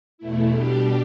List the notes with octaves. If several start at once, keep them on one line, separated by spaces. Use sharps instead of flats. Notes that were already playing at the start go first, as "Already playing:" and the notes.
E2 B2 A3 E4
B2 G3 D4 G4